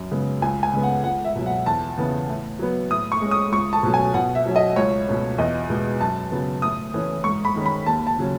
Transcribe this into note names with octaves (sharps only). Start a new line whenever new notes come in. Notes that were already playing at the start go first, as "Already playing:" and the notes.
Already playing: F#2
C#3 G#3 B3
C#2 G#5
G#5
C#3 G#3 B3
F#5
C#2 F#5
E5
B2 F#3
F#5
E2 A5
C#3 E3 B3
A2
F#3 B3
A2 D#6
C#6
G#3 C#4
D#6
C#2 C#6
A5
B2 F#3 A3 C#4
G#5
B2 F#5
E5
F#3 C#4
D#5
C#2 C#5
B2 A3 C#4
E2 D#5
B2 G#3 B3
F#2 A5
C#3 F#3 B3
A2 D#6
E3 A3 C#4
G#2 C#6
B5
D#3 G#3 C#4
B5
D#2 A5
A5
C#3 F#3 C#4